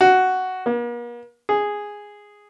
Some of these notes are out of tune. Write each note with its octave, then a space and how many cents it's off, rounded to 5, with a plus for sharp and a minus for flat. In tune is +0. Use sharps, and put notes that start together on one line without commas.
F#4 +5
A#3 +45
G#4 -5